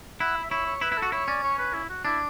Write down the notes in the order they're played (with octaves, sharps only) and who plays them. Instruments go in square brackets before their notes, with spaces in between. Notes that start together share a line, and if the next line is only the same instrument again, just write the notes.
[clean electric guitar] E4 [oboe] F#5
[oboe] E5
[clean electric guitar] E4 [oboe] C#5
[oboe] C#5
[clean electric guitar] E4 [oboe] B4
[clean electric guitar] E4
[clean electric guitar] F#4 [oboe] A4
[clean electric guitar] E4 [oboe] C#5
[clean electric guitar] C#4 [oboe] D5
[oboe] C#5
B4
E4
F#4
[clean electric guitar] D4 [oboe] E4